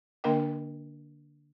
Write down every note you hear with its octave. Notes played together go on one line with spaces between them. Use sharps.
D3 A#3 D4 A#4 D#5 G5